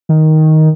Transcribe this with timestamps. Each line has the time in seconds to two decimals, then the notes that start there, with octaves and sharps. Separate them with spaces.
0.09 D#3